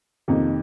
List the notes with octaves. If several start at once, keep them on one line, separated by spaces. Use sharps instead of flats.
F2 C3 D#3 A#3 D#4